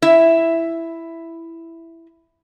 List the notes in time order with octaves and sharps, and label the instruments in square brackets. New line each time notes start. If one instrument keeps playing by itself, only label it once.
[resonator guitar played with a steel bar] E4 E5